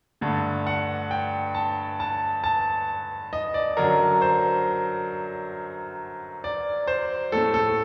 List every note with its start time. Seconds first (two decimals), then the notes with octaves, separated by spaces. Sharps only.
0.21 G2 D3 A3
0.67 F#5
1.11 G5
1.55 A5
2.00 A5
2.44 A5
3.33 D#5
3.54 D5
3.77 F#2 D3 F#3 A#4
4.22 C5
6.44 D5
6.88 C5
7.32 A2 A3 A4
7.54 A4